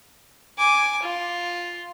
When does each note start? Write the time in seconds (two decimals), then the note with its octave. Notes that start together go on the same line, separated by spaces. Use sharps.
0.58 G#5 D6
1.02 F4